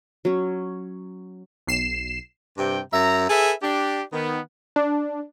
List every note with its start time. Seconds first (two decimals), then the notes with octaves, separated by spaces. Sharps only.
0.25 F#3 C#4
1.67 B1 C7 E7
2.58 G2 C3 G5
2.93 F#2 E5 A#5
3.29 G#4 A4 B4 E5
3.62 D4 G4
4.12 D#3 B3
4.76 D4